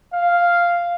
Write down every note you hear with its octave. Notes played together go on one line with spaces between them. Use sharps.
F5